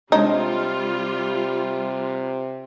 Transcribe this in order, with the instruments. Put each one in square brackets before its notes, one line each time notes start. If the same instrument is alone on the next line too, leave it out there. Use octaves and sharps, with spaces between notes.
[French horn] C3 [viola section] G3 F4 [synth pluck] G#3 D4 C#5 [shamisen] D#4